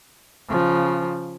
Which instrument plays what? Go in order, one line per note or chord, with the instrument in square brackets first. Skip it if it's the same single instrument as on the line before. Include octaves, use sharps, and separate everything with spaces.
[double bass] C#3 F3